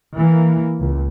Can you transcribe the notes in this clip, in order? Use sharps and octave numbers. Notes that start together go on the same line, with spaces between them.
E3 A#3
C#2